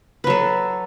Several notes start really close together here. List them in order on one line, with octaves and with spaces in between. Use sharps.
B4 F#3 A4